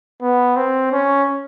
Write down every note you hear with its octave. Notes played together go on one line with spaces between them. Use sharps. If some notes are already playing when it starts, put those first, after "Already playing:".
B3
C4
C#4